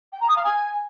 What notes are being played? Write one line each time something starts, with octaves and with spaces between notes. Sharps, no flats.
G5
A#5
D#6
F5
G#5